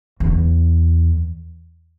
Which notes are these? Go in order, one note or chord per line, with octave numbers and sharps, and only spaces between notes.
E2